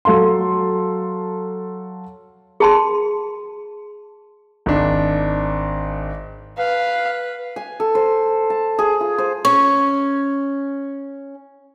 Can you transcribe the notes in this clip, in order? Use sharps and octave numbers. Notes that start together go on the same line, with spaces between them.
F#3 A4 F5 C6
G#4 A5 C6
G#1 D4
B4 F5
G#5
A4
C5
A5
G#4
F4
C5
C#4 C#6